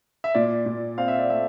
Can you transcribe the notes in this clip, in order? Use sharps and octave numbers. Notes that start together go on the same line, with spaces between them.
E5
A#2 D5
A#2
C4 F5
E5
D5
A3 E5